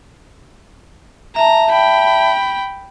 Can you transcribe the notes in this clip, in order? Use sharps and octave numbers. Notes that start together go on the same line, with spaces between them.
E5 A5 A#5
G5 B5